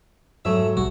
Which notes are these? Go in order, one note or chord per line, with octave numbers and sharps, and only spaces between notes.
G#2 F#3 A3 E5
B1 G3 F#4